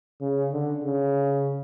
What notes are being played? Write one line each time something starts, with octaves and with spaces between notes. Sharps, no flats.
C#3
D3
C#3